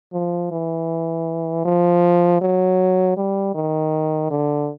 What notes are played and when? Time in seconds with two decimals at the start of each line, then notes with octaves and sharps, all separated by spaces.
0.13 F3
0.51 E3
1.65 F3
2.41 F#3
3.17 G3
3.55 D#3
4.30 D3